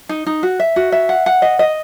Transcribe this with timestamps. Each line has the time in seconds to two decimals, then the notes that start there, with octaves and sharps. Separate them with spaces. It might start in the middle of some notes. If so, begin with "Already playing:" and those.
0.09 D#4
0.26 D#4
0.43 F#4
0.60 E5
0.76 F#4
0.92 E5
1.09 F#5
1.26 F#5
1.42 D#5
1.59 D#5